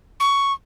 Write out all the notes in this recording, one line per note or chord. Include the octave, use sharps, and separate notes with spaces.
C#6